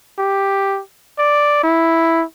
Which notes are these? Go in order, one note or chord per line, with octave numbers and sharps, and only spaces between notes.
G4
D5
E4